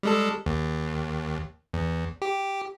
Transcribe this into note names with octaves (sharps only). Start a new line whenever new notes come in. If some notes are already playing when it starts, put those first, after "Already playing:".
G3 G#3 A4
D#2
E2
G4